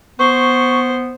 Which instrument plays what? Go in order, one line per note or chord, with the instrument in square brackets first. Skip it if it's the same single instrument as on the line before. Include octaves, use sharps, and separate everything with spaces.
[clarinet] B3 [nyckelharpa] C5 [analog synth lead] C#6